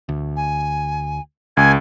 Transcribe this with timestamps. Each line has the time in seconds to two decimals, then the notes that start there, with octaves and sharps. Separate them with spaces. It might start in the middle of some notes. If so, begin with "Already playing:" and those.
0.09 D2
0.36 G#5
1.57 C#2 G#5 G#6